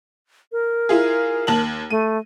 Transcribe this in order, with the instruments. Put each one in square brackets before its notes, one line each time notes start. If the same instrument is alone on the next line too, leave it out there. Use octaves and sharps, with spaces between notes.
[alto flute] A#4
[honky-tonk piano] E4 F4 G#4
D#2 A5 F#7
[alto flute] A3 [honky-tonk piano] D#7